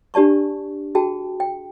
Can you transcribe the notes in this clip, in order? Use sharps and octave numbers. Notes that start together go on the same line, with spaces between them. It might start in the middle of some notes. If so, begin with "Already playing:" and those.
D4 G4 D5 A5 C#6
F#4 G#4 G5 A5
G5